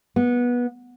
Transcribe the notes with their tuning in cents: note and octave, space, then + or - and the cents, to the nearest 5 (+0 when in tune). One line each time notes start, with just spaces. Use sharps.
B3 -20